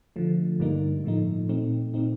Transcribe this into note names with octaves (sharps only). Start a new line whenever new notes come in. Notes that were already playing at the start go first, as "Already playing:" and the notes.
D3 F3 A3
G2 D3 G3 A#3 D#4
A2 F3 A3 D#4
A#2 A3 C4 D#4
A#2 A3 C4 D#4